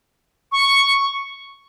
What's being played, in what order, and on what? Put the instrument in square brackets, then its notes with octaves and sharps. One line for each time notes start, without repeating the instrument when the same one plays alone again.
[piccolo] C#6